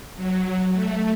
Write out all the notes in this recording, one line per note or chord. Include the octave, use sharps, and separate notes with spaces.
F#3
A3